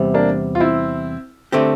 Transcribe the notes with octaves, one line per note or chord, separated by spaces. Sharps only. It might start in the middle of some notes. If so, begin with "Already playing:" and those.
Already playing: E2 C3 G3
A#3 D4
F4
C4 E4
D3 A3 C4 G4